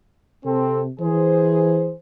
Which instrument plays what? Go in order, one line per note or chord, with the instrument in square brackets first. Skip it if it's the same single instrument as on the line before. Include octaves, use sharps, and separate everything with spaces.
[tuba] C3 [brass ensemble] C4 A4
[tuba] E3 [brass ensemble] G#4 C5